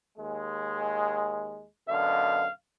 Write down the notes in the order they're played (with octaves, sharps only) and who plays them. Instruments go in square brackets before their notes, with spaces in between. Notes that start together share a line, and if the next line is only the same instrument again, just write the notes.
[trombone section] D#2 G#3
[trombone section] F#2 B2 D3 [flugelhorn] F5